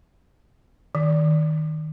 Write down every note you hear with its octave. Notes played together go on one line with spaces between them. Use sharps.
D#3